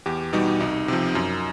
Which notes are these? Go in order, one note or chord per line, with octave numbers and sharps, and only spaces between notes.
E2 G4
B2 G3 D#4
C2 D#4
C3 F3
F#2